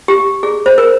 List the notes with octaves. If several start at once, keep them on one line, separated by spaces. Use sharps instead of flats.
G4
G#4
C5
A#4